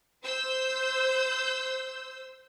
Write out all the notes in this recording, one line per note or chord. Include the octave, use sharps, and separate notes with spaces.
C5 E6 G6